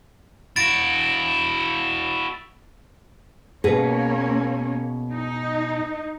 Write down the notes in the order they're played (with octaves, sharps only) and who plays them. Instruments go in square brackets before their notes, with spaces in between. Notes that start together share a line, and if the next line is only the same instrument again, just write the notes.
[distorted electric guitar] E4 F#4 [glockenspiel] A6 D7
[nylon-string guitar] B2 G#4 B4 [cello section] A#3 C#4
[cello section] D#4